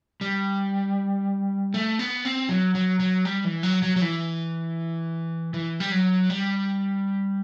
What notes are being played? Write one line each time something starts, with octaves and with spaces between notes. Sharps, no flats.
G3
A3
B3
C4
F#3
F#3
F#3
G3
E3
F#3
F#3
F#3
E3
E3
G3
F#3
G3